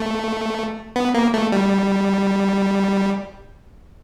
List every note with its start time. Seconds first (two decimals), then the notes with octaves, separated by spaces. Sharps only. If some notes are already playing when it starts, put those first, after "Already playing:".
Already playing: A3
0.96 B3
1.14 A#3
1.34 A3
1.52 G3